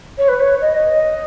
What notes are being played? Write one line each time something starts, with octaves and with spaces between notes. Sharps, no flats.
C#5
B4
C#5
D#5